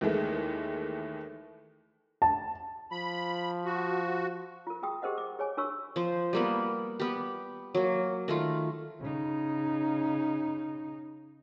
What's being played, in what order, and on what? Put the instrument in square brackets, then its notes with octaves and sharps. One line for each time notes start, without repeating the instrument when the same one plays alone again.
[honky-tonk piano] D#2 E3 G#3 A3
[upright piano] A5
[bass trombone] F3 [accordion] B5
[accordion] F#4
[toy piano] F4 A#4
F#4 G#4 G5 D#6
G4 G#4 A#4 C5 D#5 F#5
G#4 D6
G#4 C#5 G#5
D4 F#4 A#4 C#5 C#6 E6
[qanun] F3 C5
G3 A#3 B3
B3 G4
F#3 A#3
D#3 A3 F4
[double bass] C#3 D#4